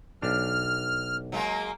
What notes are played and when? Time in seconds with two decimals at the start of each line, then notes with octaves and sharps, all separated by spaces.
0.22 B1 D4 F6
1.32 F#3 G#3 A#3